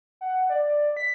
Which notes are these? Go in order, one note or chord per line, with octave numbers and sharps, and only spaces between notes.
F#5
D5
B6